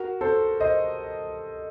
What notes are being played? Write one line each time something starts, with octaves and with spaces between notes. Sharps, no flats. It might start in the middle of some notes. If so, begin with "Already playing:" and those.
Already playing: F#4 A#4
A4 C5
C5 D#5